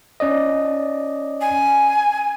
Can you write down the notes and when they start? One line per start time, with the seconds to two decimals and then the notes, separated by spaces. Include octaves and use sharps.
0.20 C#4 D5 D#5
1.41 G#5